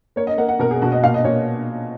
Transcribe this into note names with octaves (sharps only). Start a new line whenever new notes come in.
A#3 C#5
D#5
A#3 F#5
F#5
B2 A#4
G#4
B2 F#4
D#5
A#2 F5
D#5
A#2 C#5